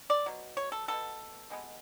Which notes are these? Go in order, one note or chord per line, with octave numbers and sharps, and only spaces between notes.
D5
B2 F#3
C#5
A4
B2 F#3 B3 A4
B2 G#3 B3